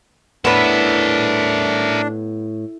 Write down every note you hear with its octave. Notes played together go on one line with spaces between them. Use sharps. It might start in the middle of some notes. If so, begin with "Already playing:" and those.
A2 B3 D4 A#4 B4 E5